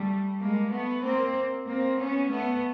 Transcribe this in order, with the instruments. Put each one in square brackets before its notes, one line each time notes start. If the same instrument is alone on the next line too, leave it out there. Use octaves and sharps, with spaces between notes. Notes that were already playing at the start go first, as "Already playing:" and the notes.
Already playing: [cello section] G3 A3
G#3 A#3
A3 B3
A#3 C4
A#3 C4
B3 C#4
A3 B3